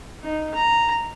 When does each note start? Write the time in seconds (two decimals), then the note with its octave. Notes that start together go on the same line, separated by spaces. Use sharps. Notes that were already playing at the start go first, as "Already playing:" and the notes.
0.23 D#4
0.55 A#5